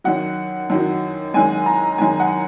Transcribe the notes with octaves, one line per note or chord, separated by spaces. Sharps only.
F#2 D#3 F#3 F#5
F#2 D#3 F#3
F#2 D#3 G#3 G#5
A#5
F#2 D#3 G#3 G#5
F#5